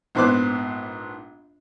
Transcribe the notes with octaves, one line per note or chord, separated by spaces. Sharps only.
A#1 G#2 B3 C5 D6 F#6